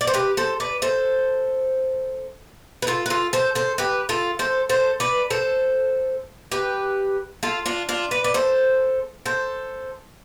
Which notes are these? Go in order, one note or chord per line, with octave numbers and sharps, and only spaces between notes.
D5
C5
G4 B4
A4 C5
B4 D5
A4 C5
B4
F4 A4
B4
F4 A4
A4 C5
A4 C5
G4 B4
F4 A4
A4 C5
A4 C5
B4 D5
A4 C5
G4 B4
F4 A4
D4 F4
D4 F4
B4 D5
D5
A4 C5
A4 C5